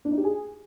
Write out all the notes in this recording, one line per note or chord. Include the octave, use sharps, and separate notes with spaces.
D4
D#4
G4
G#4